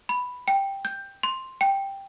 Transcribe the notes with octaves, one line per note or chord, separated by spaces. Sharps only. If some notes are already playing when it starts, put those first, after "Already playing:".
B5
G5
G6
C6
G5